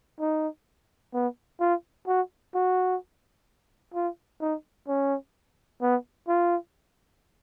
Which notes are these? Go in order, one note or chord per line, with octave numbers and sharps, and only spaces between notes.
D#4
B3
F4
F#4
F#4
F4
D#4
C#4
B3
F4